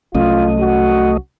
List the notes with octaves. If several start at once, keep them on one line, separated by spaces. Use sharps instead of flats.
C2 F#3 A3 C#4 F4 D#5
F#4